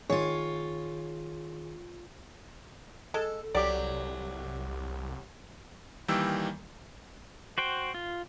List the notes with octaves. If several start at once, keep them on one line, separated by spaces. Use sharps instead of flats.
D#3 F4 G#4 C#5
G#3 A4
C2 F#3 G4 D5
D#3 E3 G3 A#3 G5 E6
F#4 C5 G5
F4